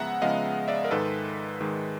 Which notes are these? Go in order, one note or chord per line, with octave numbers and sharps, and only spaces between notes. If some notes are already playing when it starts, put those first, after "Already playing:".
Already playing: C#3 F3 G#3 B3 E5 F#5 A#5
C#3 F3 G#3 B3 D#5 F5
D5 E5
A#4
G#2 D#3 G#3 A4 B4
G#2 D#3 G#3